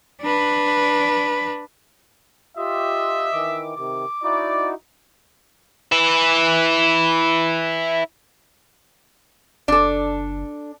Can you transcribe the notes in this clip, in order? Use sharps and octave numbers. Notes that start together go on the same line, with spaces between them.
D4 B4
F4 G4 D#5 E5
D#3 E3 D6
C3 D#3 D6
D#4 E4 F#4 D5
E4 B4
F#1 D4 A4